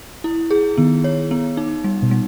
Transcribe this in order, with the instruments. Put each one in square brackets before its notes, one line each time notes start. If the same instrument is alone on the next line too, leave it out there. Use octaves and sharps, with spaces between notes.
[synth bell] E4
G#4
[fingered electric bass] D#3 [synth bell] B3
[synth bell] C#5
B3
D#4
G3
[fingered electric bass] B2
[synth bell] G3